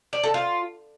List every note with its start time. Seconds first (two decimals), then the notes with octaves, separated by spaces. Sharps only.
0.13 D5
0.23 A4
0.34 F4